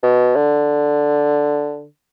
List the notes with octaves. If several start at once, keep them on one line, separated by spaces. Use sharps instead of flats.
B2
D3